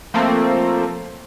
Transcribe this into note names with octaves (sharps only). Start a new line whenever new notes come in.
F3 A3 A#3 C4